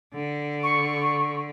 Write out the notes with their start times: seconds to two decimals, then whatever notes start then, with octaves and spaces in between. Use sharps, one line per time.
0.14 D3
0.63 C#6